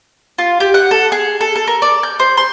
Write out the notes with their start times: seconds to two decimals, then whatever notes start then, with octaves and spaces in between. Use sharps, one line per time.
0.38 F4
0.60 G4
0.74 F#5
0.91 A4
1.12 G#4
1.41 A4
1.55 A4
1.67 A#4
1.82 D5
2.03 G6
2.19 C5
2.37 C6